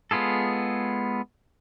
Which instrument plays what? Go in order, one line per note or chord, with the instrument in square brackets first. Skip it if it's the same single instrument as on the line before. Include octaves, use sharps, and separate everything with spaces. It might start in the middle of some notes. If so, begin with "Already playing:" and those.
[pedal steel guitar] G#3 B3 F4 G#4 A4